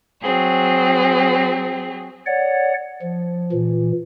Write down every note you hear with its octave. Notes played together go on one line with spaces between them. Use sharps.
F#3 C4 G#4
C#5 D5 F#5
F3
A#2 E3